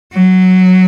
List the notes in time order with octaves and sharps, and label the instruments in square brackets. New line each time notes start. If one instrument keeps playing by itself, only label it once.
[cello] F#3